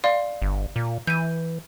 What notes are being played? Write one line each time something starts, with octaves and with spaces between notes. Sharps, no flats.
D5 F5 C6
G1
A#2
E3 G6 D#7